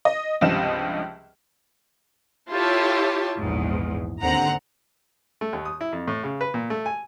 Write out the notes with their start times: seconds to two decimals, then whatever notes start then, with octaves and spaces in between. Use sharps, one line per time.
0.05 D#5
0.41 C#2 G2 C3 F3 D#5 E7
2.50 E4 F4 G4 A4 C#5 A5
3.40 A#1 E2 G#2
4.21 D#2 D3 C4 F#5 A#5
5.41 A3
5.53 D#2
5.65 D#6
5.81 E4
5.92 F2
6.08 A2
6.24 C#3
6.41 B4
6.54 A#2
6.70 A3
6.86 G#5